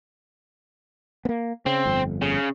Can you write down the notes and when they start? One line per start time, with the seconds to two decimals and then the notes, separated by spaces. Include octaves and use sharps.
1.25 A#3 B3
1.66 C#3 C4
1.85 G1 F2
2.22 C#3